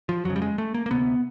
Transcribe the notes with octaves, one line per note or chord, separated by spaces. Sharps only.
F3
F2 C#3 F#3
G3
G#3
A3
A#3
A#3
D2 C3 B3